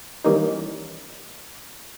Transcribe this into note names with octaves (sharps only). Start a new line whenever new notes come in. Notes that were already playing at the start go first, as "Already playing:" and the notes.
D#3 E3 G3 A#3 C#4 D#4